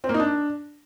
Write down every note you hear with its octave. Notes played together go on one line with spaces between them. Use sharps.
C4
A#3
D#4
D4